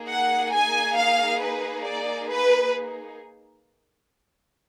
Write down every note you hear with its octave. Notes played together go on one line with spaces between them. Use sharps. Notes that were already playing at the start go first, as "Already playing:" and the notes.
Already playing: A#3 D#4 G#4
F#5
G#5
F5
B4
D5
B4